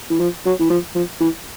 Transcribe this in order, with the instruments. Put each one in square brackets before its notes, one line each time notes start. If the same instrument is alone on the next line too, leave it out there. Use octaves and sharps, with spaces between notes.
[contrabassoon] E3
F3
F#3
E3
F3
F3
E3